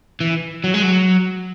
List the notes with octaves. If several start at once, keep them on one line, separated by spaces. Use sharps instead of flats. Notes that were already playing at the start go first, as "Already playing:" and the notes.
E3
F#3
G#3
F#3